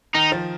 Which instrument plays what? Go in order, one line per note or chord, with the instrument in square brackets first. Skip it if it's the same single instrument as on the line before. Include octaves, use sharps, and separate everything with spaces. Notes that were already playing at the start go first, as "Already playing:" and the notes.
[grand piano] D#3 [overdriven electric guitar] D#4
[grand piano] F3